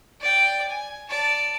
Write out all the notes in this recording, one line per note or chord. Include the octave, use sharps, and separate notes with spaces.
D5 G5
G#5
D5 A5